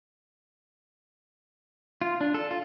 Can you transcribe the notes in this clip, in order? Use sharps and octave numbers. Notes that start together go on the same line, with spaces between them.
F4
D4
A4
F4